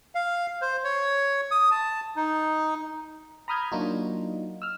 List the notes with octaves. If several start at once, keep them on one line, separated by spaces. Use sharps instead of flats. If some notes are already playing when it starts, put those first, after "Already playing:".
F5
C5
C#5
D#6
A5
D#4
A#5 B5 D#6 F6 G6 G#6
F#3 A#3 D4 D#4 F4 F#4
E6 F6